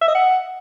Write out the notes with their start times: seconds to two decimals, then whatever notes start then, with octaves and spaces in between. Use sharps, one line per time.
0.02 E5
0.08 D#5
0.15 F#5